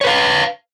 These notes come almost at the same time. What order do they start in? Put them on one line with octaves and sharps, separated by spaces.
C#5 B4 F5